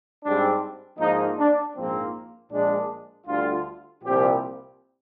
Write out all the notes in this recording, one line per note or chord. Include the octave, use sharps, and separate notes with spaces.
G#2 G3 C4 D4
G#2 F3 A#3 D#4
D4
A#1 G#2 F3 A#3 C4
A#1 A#2 G#3 D4
D2 D3 G3 F4
C2 A#2 F3 C4 G4